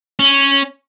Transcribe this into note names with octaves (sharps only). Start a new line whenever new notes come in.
C#4